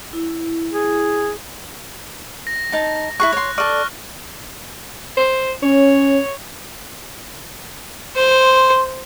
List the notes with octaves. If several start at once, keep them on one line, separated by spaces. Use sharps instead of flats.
E4
G#4
A#6
D#4 A5
E4 G#4 C#6 F#6
C#5 C6
A4 D5 C#6 F6
C5
C#4 C#5
C5 C6